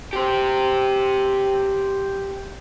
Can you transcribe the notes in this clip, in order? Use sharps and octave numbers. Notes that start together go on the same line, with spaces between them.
G4 C5